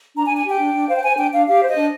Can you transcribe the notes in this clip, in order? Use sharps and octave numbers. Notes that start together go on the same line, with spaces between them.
D4 A#5
G#5
D4
G#5
G4 G5
D4
D4
C5 F5
G5
C5 G#5
D4 G5
D4 F5
G4 F5
C5
D#5
D4